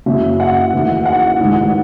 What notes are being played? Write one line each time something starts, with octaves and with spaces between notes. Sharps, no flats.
F#1 F#2 C#3 E3 E5
F#5
E2 D#3 F#3 A3
F#5
A1 G#2 D#3